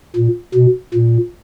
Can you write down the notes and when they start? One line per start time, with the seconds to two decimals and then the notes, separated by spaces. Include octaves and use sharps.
0.16 A#2
0.54 B2
0.94 A#2